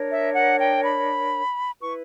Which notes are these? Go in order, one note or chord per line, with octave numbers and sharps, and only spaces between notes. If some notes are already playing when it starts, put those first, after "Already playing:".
Already playing: D4 A#4 C#5
E5
F#5
G5
B5
E4 B4 C#6